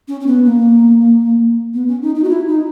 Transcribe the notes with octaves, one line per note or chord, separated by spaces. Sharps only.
C#4
C#4
B3
A#3
B3
C#4
D#4
D#4
F#4
E4
D#4